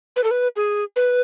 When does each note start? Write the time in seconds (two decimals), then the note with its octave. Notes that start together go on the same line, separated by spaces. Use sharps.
0.16 B4
0.24 A4
0.31 B4
0.56 G#4
0.96 B4